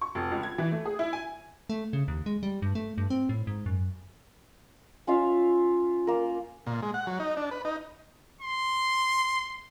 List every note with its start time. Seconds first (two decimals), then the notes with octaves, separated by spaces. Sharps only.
0.01 C#6
0.15 F1
0.31 C#2
0.43 G#6
0.58 E3
0.72 A3
0.85 G#4
0.99 E4
1.13 G#5
1.70 A3
1.93 C#3
2.08 D#2
2.26 G#3
2.43 G3
2.62 G2
2.75 A3
2.98 G2
3.10 C4
3.29 A2
3.47 G#2
3.66 F#2
5.07 C#4 F4 E5 F5
6.07 A#3 A#4
6.67 A#2
6.83 G#3
6.94 F#5
7.07 F#3
7.20 D#4
7.37 D4
7.51 B4
7.65 D#4
8.41 C6